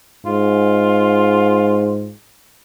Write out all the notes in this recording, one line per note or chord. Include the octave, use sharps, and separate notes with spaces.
G#2 F4